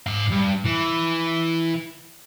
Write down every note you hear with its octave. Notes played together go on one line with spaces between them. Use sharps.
G#2 F5
G2
E3